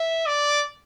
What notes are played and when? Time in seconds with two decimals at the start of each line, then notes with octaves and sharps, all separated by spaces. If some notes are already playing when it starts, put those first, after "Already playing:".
Already playing: E5
0.27 D5